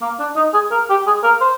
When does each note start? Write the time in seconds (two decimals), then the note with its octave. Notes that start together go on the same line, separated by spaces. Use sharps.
0.02 A#3
0.19 D4
0.36 D#4
0.54 G#4
0.71 A#4
0.90 G4
1.07 G#4
1.24 A#4
1.41 C5